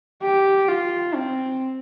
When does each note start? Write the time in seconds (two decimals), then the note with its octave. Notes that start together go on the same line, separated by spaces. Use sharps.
0.23 G4
0.68 F4
1.14 C4